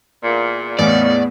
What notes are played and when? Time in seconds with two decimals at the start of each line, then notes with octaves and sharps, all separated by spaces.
0.22 E2 A#2
0.79 E2 A2 A#3 B3 C#4 D#4 D5